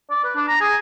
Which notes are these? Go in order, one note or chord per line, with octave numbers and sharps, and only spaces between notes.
D5
B4
D4
A#5
G#4